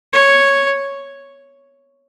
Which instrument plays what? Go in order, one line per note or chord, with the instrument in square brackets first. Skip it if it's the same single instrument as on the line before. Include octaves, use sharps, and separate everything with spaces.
[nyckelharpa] C#5